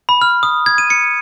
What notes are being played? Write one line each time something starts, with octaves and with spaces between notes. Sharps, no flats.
B5
F6
D#6
G#6
D#7
C#7